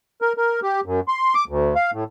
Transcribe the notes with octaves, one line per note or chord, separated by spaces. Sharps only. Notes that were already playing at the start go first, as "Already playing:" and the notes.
A#4
A#4
G4
F#2
C6
D6
D2
F5
A2